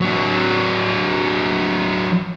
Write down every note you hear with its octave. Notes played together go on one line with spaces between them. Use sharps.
F#3 D4